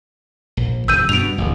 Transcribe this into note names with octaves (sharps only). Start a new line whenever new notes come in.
A#1
F#1 E6 G6 D#7
G2 B2 B3 D7 F7
D1 A1